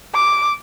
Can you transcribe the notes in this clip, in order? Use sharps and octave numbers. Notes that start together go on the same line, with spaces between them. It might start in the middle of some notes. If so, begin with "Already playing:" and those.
D6